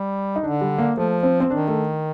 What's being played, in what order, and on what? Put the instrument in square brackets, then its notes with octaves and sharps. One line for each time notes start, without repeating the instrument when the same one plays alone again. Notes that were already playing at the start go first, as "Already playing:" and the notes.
Already playing: [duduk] G3
[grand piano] D#4
[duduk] D3 [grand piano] D4
[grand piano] G3
A#3
[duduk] F3 [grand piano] A3
[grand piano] C4
C4
[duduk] D#3 [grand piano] D4
[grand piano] A3